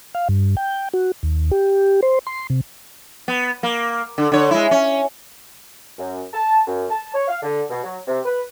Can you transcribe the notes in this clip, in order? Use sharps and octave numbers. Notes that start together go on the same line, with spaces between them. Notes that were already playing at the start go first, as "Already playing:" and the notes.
F5
G2
G5
F#4
D#2
G4
C5
C6
C3
B3
A#3
D3
D3 C#5
G#3 E4
C#4
F#2
A5
F#2
A5
C#5
F5
D3
B2
F#3
C3
B4